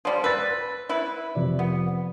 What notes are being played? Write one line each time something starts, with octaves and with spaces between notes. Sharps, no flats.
F3 G3
B4 E6 A6
E4 B4
F2 C3 D5
B3